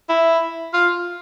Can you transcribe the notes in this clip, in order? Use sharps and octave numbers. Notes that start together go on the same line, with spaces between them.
E4
F4